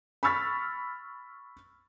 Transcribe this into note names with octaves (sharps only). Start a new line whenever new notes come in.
B5 C#6 E6 F6 A6 B6